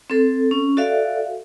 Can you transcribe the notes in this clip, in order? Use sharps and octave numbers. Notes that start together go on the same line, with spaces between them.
C4 A4
C#4
F#4 A4 D5 E5 F5